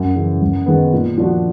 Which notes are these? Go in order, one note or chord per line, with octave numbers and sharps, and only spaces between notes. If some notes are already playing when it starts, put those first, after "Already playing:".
Already playing: F#2
C#3 E3
F#2
D#3 G#3 B3
A#2
F3 A#3 D4 F#4